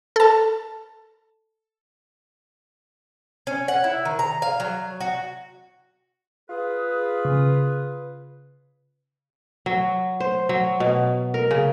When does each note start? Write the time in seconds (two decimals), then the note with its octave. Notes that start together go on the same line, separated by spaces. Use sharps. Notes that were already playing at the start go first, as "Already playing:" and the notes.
0.16 A4 A5
3.47 C#4
3.68 F#5
3.84 E4
4.05 D#3
4.19 A#5
4.42 F5
4.60 F#3
5.00 F#4
6.50 F4 G#4 B4
7.25 C#3
9.66 F#3
10.20 C5
10.49 F#3
10.80 B2
11.34 A#4
11.51 C#3